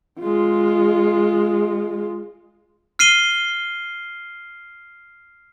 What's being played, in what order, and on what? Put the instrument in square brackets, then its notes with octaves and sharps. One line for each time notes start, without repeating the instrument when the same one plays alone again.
[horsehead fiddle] G#3 F4
[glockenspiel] F6 C7 D#7 G7